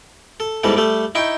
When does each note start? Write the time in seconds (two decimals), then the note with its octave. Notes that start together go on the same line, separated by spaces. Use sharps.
0.40 A4
0.63 E2 G#2 E3 G3 A4
0.77 G3 A3 A4
1.15 D#4 E4 G5 C#6